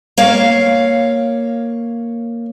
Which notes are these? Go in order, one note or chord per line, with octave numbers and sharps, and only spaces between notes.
A#3 C#5 F5